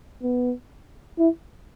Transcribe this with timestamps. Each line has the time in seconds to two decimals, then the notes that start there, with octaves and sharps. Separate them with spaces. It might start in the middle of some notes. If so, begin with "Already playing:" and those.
0.23 B3
1.18 E4